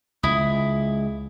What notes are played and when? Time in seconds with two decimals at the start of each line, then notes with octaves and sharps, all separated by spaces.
0.23 C#2 E4 D#6